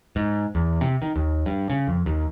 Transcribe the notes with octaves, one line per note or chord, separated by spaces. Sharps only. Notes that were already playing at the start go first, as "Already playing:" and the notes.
G#2
E2
C3
D#3
D#2
G2
C#3
F2
D#2